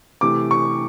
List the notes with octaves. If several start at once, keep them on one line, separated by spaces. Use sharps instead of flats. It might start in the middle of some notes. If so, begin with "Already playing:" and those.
C3 E3 A3 D6
C#6